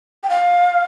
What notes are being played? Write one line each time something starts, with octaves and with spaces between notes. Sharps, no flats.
G5
F5